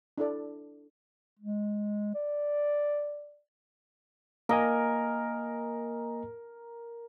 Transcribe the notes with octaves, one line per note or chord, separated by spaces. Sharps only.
D4 E4 A4 D5
G#3
D5
A#3 A#4 D#5 G#5